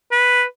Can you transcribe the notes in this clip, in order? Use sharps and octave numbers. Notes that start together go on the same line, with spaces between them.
B4